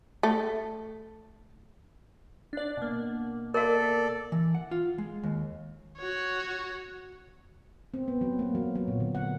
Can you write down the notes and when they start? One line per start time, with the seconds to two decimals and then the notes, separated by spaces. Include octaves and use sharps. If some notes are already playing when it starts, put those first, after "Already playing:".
0.23 A3
2.53 D4 D5
2.77 B2 A#3
3.54 A4 A#4 D5 F5
4.32 E3
4.55 F#5
4.71 F4
4.98 G#3
5.23 D#2
5.98 F#4 C#5
7.94 C4
8.08 B3
8.21 F#3
8.39 A#3
8.55 F#3
8.75 F#3
8.88 A#2
9.00 D3
9.15 F#5